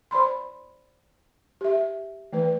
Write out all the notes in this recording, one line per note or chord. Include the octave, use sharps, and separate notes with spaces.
C5 D5 B5 C6
G4 E5
E3 A3 B4